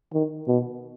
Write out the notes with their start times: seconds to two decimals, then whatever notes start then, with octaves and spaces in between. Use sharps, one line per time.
0.13 D#3
0.48 B2